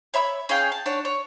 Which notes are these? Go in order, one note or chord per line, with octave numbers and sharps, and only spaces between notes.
C#5 E5 B5 E6
C#4 G#4 F5 G5
A5
D4 C#5 F#5
C#5